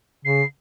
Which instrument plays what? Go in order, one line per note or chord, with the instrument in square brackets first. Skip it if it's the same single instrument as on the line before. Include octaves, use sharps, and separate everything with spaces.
[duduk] C#3 [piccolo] C7